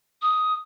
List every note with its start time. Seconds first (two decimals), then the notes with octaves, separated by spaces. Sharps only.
0.22 D#6